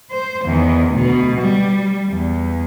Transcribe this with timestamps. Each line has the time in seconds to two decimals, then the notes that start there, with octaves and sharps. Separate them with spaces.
0.11 C5
0.45 E2 D#3
0.92 D2 B2
1.41 G3
2.10 E2